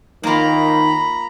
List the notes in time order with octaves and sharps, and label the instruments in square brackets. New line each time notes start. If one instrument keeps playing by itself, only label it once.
[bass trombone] D#3 [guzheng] A#3 F4 [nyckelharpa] A#5 B5